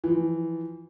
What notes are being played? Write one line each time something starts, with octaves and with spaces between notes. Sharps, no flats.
E3 F3